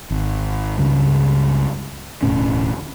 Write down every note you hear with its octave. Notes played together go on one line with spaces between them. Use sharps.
G#1
C#2 G2 C#3
E1 D2 A2 C#4